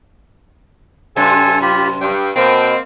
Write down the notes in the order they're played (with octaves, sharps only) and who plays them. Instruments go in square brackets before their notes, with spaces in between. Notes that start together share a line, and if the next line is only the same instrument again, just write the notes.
[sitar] F#2 C3 [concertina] A4 G#5
[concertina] F4 G4 B5
[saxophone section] G2 [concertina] G5
[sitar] B2 [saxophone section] A#3 C4 [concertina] G5